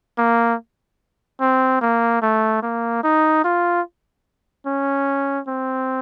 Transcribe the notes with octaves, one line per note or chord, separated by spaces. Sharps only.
A#3
C4
A#3
A3
A#3
D#4
F4
C#4
C4